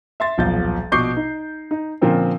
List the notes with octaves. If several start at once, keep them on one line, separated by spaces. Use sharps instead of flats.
E5 C6 A6
D#1 B1 F3 G6 A6
A#1 B2 C#6 D6 G6 C7
D#4
D#4
A#2 D3 F3 A#3 C4 C#4